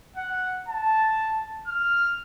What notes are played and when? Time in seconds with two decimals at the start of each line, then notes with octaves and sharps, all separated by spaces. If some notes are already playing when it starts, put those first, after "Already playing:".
0.16 F#5
0.68 A5
1.67 F6